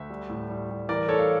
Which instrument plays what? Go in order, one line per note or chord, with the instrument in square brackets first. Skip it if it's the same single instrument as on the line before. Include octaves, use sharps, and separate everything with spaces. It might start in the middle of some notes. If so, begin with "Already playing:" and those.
Already playing: [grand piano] D2 E5
G3
A2
G3
G3
E3 A#4 D5
A3 A4 C#5
F5